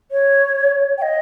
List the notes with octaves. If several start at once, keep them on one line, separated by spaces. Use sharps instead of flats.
C#5
G5
D#5